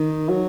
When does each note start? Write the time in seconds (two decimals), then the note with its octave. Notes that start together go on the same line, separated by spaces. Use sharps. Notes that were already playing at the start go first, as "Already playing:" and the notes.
Already playing: D#3
0.29 F#3